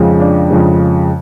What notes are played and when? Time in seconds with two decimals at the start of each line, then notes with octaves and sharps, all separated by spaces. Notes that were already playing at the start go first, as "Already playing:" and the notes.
Already playing: F2 C#3 F3 G#3
0.20 D4
0.51 F2 C#3 F3 G#3